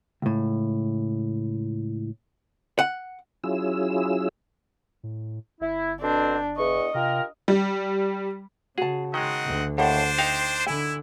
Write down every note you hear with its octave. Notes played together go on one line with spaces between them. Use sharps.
C#2 A2
F#5
F#3 C#4 E4 F4 G#4 E6
A2
G1 E4
B2 D3 C4 D4
E2 D#5 C#6
C3 F4 G4 A#4
G3
C#3 F#4 G#4 A5
D#3 G#3 C4 D#5 F#5
D2
D#2 A2 D4 A4 C5 F#5
D#4 F5 G5
D3 E4 G#5